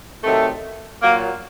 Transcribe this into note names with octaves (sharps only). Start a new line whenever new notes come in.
C3 D#3 F#3 A3
A#2 F#3 A#3